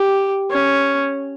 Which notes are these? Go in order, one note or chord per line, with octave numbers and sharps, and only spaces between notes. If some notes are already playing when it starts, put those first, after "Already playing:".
Already playing: G4
C#4